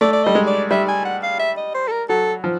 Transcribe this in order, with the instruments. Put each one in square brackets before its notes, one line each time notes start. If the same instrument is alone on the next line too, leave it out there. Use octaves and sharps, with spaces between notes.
[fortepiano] A3 [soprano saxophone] D5
[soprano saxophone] D5
[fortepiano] G3 [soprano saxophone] D#5
[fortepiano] G#3
[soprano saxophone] D5
[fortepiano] G3 [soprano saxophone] E5
[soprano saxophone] G#5
F#5
F5
E5
D#5
C5
A4
A#4
[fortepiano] F#3 [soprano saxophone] A4
[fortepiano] F3